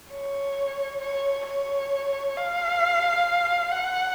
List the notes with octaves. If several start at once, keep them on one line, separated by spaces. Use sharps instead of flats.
C#5
C#5
C#5
F5
F#5